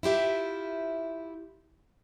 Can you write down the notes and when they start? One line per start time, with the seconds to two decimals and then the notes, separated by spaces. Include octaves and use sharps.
0.03 E4 F4 G4 E5